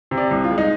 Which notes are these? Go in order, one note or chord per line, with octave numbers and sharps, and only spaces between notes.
C3
D5
C2
F4
G#3
D#4